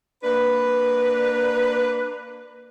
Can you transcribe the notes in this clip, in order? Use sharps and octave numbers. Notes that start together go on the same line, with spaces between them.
A#3 D4 B4